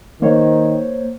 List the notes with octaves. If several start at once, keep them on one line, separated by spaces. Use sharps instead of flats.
D#3 A#3 C5 C#5